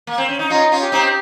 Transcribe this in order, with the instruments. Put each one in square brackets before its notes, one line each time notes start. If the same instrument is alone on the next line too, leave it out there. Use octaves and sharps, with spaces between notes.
[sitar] A#3
C4
C#4
D#4
[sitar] C#4 F4 [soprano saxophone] D#4
[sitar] C#4 F4
[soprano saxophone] G4
[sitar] C4 D#4